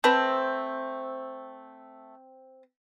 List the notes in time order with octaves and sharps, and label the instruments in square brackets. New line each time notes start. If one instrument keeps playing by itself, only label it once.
[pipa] A3 B4 A5 [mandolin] C4